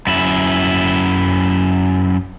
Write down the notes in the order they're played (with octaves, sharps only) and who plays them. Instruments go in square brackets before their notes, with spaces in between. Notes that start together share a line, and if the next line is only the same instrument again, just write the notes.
[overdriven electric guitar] F#2 E4